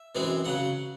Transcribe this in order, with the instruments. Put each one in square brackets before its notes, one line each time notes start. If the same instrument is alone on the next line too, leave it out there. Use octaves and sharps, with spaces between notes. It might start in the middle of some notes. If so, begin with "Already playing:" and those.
Already playing: [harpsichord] E5
F#2 E3 G#3 C4
C#3 F#3 F#5